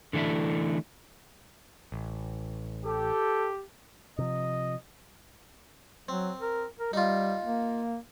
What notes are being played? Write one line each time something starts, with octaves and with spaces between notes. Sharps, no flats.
D3 E3 A3 D4 E4
A1
G4 A4
C3 F3 D#5
F#3 C4
A#4
A#4
G3 D#4 F4
A#3